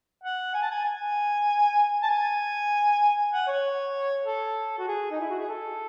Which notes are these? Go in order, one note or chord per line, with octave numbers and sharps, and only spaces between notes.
F#5
G#5
A5
G#5
G#5
A5
G#5
F#5
C#5
A4
F#4
G#4
D#4
E4
F#4
G#4
A4